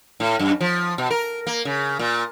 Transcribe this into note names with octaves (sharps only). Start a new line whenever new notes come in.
A2
F#2
F3
B2
A#4
A#3
C#3
A#2